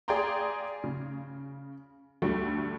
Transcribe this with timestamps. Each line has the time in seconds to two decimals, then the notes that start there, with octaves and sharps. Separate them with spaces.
0.08 G#4 D5 F5 G5 A#5 C6
0.84 C#3
2.22 D2 G3 A3 F#4